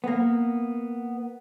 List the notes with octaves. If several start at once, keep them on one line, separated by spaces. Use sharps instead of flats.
A#3 B3